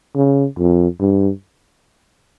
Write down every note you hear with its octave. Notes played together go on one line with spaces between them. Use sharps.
C#3
F2
G2